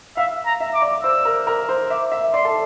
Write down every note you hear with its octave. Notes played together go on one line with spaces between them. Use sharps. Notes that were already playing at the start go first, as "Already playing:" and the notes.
E5 F5
A#5
E5
D6
D5
C5 E6
A#4
A#4
C5
E5 D6
E5
D5 C6
A4